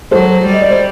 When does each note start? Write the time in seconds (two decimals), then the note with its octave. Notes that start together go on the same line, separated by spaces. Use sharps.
0.11 F#3 A4 C5
0.45 G3
0.52 D#5
0.62 D5
0.70 C5